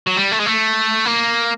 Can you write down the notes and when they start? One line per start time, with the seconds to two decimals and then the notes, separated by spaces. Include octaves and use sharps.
0.07 F#3
0.17 G3
0.32 A3
0.40 G#3
0.46 A3
1.06 A#3